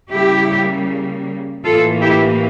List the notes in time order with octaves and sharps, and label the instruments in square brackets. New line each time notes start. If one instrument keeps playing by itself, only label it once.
[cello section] C#3 G3 A#3 E4 G4
A2 E3 A#3 F4 A4
E4 G4